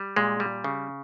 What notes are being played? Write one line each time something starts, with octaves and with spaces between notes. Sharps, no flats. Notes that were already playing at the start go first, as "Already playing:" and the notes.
Already playing: G3
A#2 G#3
G3
C#3